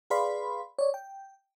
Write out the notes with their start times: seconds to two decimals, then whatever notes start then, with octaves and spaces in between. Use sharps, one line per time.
0.10 G#4 B4 D5 F5 B5 C6
0.79 C#5 D5
0.94 G5